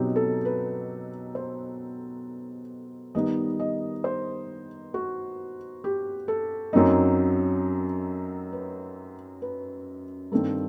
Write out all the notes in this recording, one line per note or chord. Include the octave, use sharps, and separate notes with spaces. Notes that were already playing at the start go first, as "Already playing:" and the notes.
Already playing: B2 F#3 C4 D#4 G4
A4
B4
C5
D#3 G3 B3 D#4 D#5
D#5
C5
F#4
G4
A4
F#2 F#3 C4 D#4
B4
B4
G2 D#3 G3 C4 A4